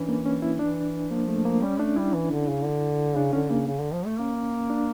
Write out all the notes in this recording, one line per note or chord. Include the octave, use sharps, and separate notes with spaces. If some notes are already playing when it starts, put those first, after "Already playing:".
Already playing: E3 C#4 D4
A#3
C#4
E4
E3 D4
F3 A#3
A3
A#3
G3 C#4
A3 D4
G3 E4
E3
D3
C#3
D3
C#3 D4
D3 C#4
C#3 A#3
C#3
D3
F3
A3
A#3 C#4
D4